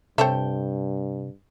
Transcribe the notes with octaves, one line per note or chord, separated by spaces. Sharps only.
G2 C3 A4 C5 C#5 E5 G5